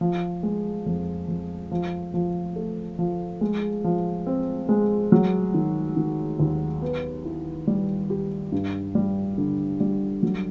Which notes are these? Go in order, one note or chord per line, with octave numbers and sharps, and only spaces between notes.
F3
G#3
F2
F2
F3
F3
A3
F3
G#3
F3
C4
G#3
F#3
D#3
D#3
D#2
B3
E4
G3
G4
G2
G3
D3
G3
F#3